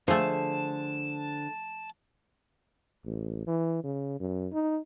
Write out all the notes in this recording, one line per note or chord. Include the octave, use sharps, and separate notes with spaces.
D3 F3 A3 G#4 C5 A5
A1
E3
C#3
F#2
D#4